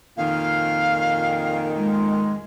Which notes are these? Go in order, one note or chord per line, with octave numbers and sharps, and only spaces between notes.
F2 A#2 D#3 F5
G#3